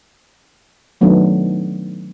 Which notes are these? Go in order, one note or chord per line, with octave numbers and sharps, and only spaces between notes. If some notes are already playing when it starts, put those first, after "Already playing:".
D#3 F#3 A3 B3 D4 D#4